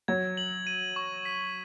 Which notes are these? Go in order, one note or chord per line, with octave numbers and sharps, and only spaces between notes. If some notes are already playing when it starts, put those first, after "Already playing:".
F#3 G#6
F#7
D#7
C#6
B6